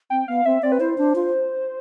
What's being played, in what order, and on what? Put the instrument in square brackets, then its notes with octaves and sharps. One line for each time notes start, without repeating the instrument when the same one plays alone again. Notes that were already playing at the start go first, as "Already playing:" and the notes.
[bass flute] C4 [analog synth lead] G5
[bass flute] B3 [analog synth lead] F5
[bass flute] C4 [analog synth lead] E5
[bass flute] C4 [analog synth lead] D5
[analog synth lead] B4
[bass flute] E4 [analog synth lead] C5
[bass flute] D4
F4